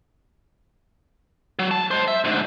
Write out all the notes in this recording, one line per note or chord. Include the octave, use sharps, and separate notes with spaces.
F#3
A5
G#3 C5
E5
D2 G#2